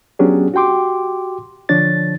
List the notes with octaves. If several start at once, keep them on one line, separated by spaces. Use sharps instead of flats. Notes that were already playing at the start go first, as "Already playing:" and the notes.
F#3 B3 C#4 D4 G4 G#4
F#4 G4 G5 C6 D6
D3 F3 D4 C#5 A6